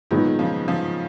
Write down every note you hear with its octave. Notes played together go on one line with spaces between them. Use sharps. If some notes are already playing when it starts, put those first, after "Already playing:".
A#2 D#3 F#3 G#3 B3 D#4
C#3 F3
C#3 F3